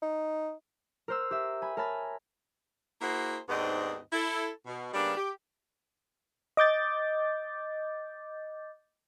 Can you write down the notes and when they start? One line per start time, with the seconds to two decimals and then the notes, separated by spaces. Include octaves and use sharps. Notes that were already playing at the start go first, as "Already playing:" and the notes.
0.02 D#4
1.08 A#4 C5 E6
1.31 G4 E5
1.62 G#5 B5
1.77 A#4 C#5 G#5 A5 B5 A6
3.01 A#3 E4 F#4 G#4 C5
3.49 D#2 G#2 B3 C4 D4 D#5
4.12 E4 A4
4.66 B2
4.93 C#3 G3 A#3 B3 D4
5.16 G4
6.57 D#5 D6 G6 A6